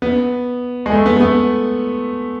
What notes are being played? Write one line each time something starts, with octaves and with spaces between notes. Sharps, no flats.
B3
G#3
A3
B3
A3
B3